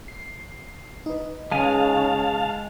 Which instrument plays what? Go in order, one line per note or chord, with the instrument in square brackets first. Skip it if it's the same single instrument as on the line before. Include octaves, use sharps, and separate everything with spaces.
[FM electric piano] C7
D#4 B4
[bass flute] C#3 [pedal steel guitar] G#3 G#5 [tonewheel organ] F5 A5